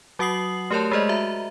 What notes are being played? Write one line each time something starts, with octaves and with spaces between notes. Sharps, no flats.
F#3 F#4 F#5 D#6 C7 F#7
A3 G4 A#4 C#5 D5 A5
G#3 G#4 C5 D5 D#5
F#4 E5 A#5